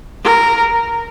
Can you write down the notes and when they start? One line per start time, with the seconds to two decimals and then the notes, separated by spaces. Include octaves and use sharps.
0.24 A#4